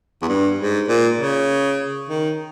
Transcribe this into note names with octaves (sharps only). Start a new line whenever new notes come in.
E2
G2
G#2
A#2
C#3
D#3